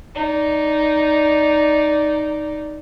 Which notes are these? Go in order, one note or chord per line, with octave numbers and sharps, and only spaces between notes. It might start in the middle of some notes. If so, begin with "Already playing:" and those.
D#4 D5